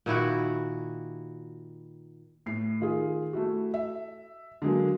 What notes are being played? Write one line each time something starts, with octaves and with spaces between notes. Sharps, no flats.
A#2 D#3 E4 F#4
A2 C7
D#3 F4 G#4
A3 E4 F#4
E5
D3 F#3 G#3 A#3